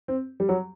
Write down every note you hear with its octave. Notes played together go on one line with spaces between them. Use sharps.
C4
G3
F#3